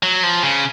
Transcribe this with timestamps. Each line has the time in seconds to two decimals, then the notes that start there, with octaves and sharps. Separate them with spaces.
0.03 F#3
0.23 F3
0.43 C#3